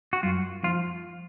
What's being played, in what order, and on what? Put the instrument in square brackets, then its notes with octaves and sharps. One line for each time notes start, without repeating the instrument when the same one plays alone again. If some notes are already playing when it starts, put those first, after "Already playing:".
[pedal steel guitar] F#4
[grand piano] F#2 [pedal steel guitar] F4
[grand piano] F3 [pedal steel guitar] F4